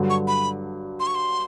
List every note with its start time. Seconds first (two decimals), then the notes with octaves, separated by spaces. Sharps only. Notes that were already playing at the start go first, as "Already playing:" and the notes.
Already playing: G2 D3 F#3
0.10 C#6
0.28 B5
1.00 C6
1.07 C#6
1.15 C6